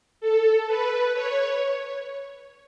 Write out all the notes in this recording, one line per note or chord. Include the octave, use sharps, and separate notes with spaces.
A4
B4
C#5